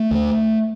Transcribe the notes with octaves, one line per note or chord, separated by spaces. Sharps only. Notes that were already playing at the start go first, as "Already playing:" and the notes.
Already playing: A3
D2 D3